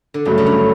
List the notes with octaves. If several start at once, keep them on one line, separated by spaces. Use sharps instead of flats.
D3
G2 C#3 F#3 A3
C#3
D3